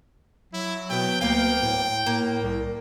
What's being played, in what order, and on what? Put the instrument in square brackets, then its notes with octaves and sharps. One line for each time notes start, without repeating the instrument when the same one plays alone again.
[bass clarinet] F#3 [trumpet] E4
[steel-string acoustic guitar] B2 B3 [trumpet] G5
[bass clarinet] D2 [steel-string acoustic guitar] A#3 B3 F5 [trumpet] G5
[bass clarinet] A2
[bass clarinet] A2 [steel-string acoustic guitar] A#3
[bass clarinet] C2